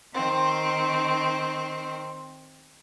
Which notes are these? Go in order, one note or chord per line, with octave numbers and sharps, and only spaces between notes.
D#3 C4